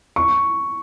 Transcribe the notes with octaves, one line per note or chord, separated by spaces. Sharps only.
C#6